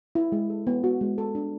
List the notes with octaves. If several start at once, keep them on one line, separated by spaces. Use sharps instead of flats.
E4
G#3
A4
B3
F#4
G#3
A4
D4